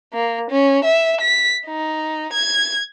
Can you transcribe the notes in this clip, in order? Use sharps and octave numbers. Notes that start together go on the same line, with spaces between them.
A#3
C#4
E5
B6
D#4
G#6